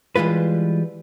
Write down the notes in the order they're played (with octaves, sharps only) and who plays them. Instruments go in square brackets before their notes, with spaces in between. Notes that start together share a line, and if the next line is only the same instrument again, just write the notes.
[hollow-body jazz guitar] E3 G3 G#3 F4 B4